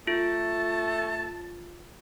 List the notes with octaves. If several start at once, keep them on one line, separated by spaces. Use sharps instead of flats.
A3 F4 A5